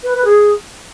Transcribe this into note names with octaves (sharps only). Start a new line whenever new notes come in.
B4
B4
G#4